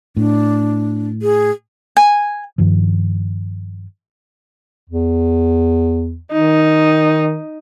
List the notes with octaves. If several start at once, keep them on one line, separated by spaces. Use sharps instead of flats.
A2 D4
G#4
G#5
G2 D#3 F3
E2
D#3 D#4